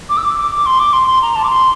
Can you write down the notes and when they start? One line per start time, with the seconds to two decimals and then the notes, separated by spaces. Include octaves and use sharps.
0.09 D6
0.17 E6
0.24 D6
0.37 D6
0.51 D6
0.66 C6
0.79 D6
0.93 C6
1.07 C6
1.22 A#5
1.35 A5
1.44 D6
1.50 C6